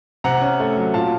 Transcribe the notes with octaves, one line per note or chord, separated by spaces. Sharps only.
C3 F#5 A#5
C#4
A3
F#3
A#2 F5 A5